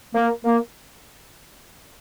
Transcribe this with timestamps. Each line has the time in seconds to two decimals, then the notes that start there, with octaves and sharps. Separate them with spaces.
0.15 A#3
0.45 A#3